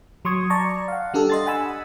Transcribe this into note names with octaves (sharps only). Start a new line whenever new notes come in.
F#3 C6 C#6 D#6 G#6
D5 A5 A#5 C#6
F5 F#5
G3 D4 G4 A4
D#5 C6 A6
F#5 G#5 B5 E6